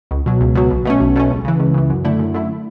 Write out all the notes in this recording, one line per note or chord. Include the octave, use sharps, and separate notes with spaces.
C#2
B2 F#3
C#2
B2 F#3
B1
B2 A3 C#4
B1
B2 A3 C#4
C#2
C#3 E3
C#2
C#3 E3
F#2
D3 A3 E4
F#2
D3 A3 E4